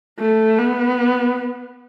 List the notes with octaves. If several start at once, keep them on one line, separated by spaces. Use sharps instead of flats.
A3
B3